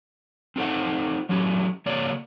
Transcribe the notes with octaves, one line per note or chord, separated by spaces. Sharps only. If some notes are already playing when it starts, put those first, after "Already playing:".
C4 D#4 F4 A4 C5 F#5
F#3 A3 C#4 E4 F#4 G4
C#3 A#3 F#4 C#5 D5